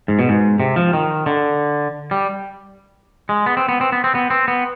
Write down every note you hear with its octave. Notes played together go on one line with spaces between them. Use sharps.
G#2
B2
G#2
C3
F3
D#3
D3
G3
G#3
B3
C4
B3
C4
B3
C4
B3
C4
B3